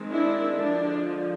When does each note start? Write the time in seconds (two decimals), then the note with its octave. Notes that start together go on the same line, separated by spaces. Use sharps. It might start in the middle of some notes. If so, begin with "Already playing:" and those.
Already playing: D#3 G#3 C4
0.11 D4 E4
0.59 D3 F3 G#3 D4